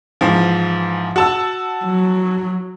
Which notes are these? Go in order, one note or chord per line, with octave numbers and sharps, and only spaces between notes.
G#2 E3 F3
F#4 A5 E6
F#3